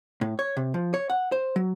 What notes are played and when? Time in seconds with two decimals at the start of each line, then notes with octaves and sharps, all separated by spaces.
0.21 A2
0.39 C#5
0.57 C3
0.74 F3
0.94 C#5
1.10 F#5
1.32 C5
1.56 F#3